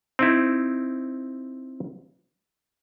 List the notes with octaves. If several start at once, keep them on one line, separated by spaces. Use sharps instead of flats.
C4 D#4 E4